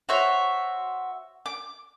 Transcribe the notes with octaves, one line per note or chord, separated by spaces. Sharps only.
F#4 C5 C#5 E5
D6